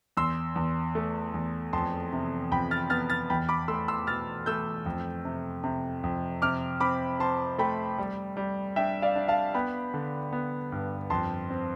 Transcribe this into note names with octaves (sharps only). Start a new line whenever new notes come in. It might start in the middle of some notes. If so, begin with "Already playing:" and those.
E2 C6 E6
E2
A3
E2
F2 A5 C6
C3
F2 G5 B5
F6 A6
B3 F6 A6
F6 A6
E2 G5 B5
B5 D6
A3 C6 E6
C6 E6
B2 F6 A6
A3 E6 G6
F2
C3
C3
F2
C3 D6 F6
C4 B5 D6
C4 A5 C6
A3 G5 B5
G3
G3
D4 E5 G5
D5 F5
D4
F5 A5
B3 G5 B5
D3
B3
G2
F2 A5 C6
C4